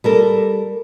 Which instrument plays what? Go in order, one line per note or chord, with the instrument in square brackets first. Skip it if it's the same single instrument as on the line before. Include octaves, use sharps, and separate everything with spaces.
[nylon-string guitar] G3 A4 A#4